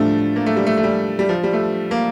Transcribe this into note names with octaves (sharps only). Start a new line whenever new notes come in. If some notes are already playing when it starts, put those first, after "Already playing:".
Already playing: A2 F3 G3 A3 D4
A#3
A3
G3
A3
A3
G3
G3
F3
G3
A3
A#3